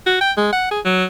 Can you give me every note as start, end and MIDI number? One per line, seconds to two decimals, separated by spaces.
0.06 0.18 66
0.21 0.32 79
0.37 0.48 56
0.52 0.67 78
0.71 0.80 68
0.85 1.04 54